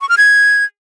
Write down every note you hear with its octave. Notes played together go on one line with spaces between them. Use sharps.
C#6
F6
G#6